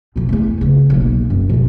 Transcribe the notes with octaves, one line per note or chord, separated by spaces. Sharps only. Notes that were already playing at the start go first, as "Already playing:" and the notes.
F2 B2
E2 A3
C#3
B1 A#3
F#2
F2 B2